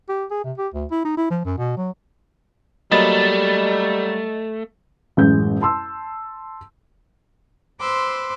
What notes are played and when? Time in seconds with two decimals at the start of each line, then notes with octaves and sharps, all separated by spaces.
0.09 G4
0.31 G#4
0.44 C3
0.58 G4
0.74 D2
0.91 E4
1.04 D#4
1.17 E4
1.30 F3
1.45 F#2
1.57 B2
1.77 F#3
2.92 F#3 G3 A3 A#3 D#5 B5 A6
5.17 A1 F#2 G#3 G6
5.61 A5 C6 E6
7.80 B4 C5 C6 D6 E6